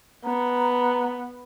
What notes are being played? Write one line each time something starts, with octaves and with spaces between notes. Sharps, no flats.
B3 A#5